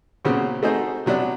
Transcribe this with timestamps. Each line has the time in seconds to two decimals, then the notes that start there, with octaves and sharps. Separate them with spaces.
0.25 A#2 C#3 F#3 B3 C4
0.63 A3 C4 D#4 F#4 G#4 C5
1.06 C3 F#3 B3 D4